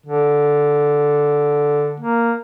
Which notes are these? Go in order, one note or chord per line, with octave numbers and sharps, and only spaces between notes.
D3
A#3